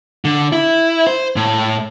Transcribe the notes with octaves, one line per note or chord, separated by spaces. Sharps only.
D3
E4
C5
A2